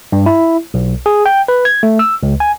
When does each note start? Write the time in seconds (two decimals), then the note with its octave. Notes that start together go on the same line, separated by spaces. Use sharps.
0.12 G2
0.26 E4
0.74 B1
1.06 G#4
1.26 G5
1.48 B4
1.65 G#6
1.83 A3
1.99 E6
2.23 C#2
2.40 G#5